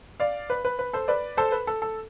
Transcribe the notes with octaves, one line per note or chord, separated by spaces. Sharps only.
D5 F5
B4
B4
B4
A4 C5
B4 D5
A4 C5
B4
A4
A4